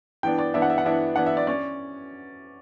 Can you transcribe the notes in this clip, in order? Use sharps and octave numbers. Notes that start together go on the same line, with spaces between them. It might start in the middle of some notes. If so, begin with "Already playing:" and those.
E3 B3 D4 G5
D5
E3 B3 D4 E5
F#5
E5
F#5
E3 B3 D4 E5
E3 B3 D4 F#5
E5
D5
C#4 D5